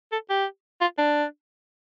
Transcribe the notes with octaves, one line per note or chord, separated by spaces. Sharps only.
A4
G4
F4
D4